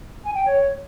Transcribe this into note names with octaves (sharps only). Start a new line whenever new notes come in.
G#5
G5
C#5